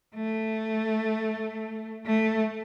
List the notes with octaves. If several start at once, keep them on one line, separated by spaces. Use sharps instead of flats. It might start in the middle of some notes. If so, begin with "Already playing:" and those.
A3
A3